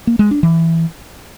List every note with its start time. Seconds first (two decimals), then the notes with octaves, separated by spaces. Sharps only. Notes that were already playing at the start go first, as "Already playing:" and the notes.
0.07 A#3
0.19 G#3
0.31 D4
0.43 E3